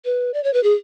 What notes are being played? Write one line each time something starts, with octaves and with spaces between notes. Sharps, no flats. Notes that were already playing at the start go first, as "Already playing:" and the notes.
B4
D5
C#5
B4
G#4